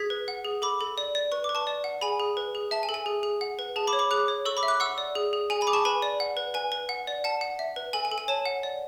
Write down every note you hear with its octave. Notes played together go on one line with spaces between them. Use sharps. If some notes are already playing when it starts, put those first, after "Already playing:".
Already playing: G#4 G#6 B6
B4
F#5
G#4
A4 B5 D6
A4
D5
D5
B4 C#6
B4 D6
A5 C#6
D5
F#5
G#4 G#5 B5
G#4
B4
G#4
E5 A5
G#5
A4
G#5
G#4
G#4
F#5
B4
G#4 A5
B5 D6
C#5
B5 D6
G#4 D6 F#6
C#5
A4 C#6 E6
B5 D6
E5
D6 F#6
F#5 C#6 E6
D5
G#4
G#4
G#4 G#5
G#5 B5
G#4 D6
A5 C#6
B4 G#5 B5
D5
F#5
B4
B4 G#5
B4
F#5
D5
F#5 A5
F#5
E5
B4
A4 G#5
G#5
A4
G#5
C#5 A5
F#5
D5